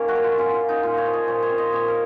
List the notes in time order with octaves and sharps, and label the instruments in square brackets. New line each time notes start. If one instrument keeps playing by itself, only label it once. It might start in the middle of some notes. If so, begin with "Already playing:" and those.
Already playing: [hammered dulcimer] D#3 A#3 C#4 A#4 C#5
F#4
F#3
F4
C#4 F4
F4
A#3
D#4
A#2 F4
C#5
F3
D#5
A#2 C#5
C#5
C4
D#5
A#2 C#5
A#4